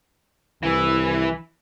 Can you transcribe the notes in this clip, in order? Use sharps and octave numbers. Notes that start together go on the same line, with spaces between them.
C2 E3